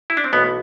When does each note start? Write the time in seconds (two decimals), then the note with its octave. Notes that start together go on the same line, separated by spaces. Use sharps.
0.10 E4
0.17 D4
0.24 C4
0.32 B1 A2 E3 B3